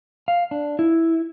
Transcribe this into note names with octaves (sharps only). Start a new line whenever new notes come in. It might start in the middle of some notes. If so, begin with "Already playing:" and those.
F5
D4
E4